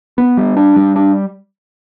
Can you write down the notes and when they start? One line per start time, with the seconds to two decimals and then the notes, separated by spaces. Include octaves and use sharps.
0.18 B3
0.37 G3
0.57 D4
0.76 G3
0.96 D4